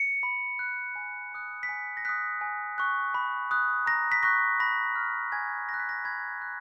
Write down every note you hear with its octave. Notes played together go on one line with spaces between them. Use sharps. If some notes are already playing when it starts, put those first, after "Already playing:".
Already playing: C#7
B5
F#6
G#5
B5 D#6 F#6
B6
G#5 C#7
A#6
D#6 F#6 B6
G#5
C#6 F#6
B5
D#6 F#6
A#5 A#6
B6
C#6 F#6 A#6
B5 A#6
F6
G#5 G#6
D#6 F#6 A#6
B6
A#6
B5 G#6
F#6